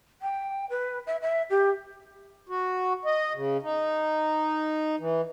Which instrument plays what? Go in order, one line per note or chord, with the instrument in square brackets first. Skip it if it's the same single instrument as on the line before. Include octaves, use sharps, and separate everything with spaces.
[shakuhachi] G5
B4
E5
E5
G4
[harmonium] F#4
D#5
C#3
D#4
E3